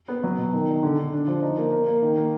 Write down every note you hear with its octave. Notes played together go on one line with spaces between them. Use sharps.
B3
F#3
B2
D#3
D#4
D3
D3
D4
F3
D#4
A#3
A#3
A#3
D#3
A#3